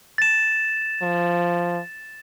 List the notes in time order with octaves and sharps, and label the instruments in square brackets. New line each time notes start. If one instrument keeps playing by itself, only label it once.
[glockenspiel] A6 E7
[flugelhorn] F3